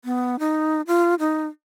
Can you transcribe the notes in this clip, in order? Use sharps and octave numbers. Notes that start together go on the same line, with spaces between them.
B3
D#4
F4
D#4